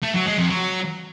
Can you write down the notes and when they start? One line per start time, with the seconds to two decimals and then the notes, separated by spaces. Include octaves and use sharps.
0.03 A3
0.14 F#3
0.26 G#3
0.38 F2
0.50 F#3